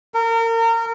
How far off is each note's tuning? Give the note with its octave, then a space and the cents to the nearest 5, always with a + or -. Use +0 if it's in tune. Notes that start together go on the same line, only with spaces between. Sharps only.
A#4 -30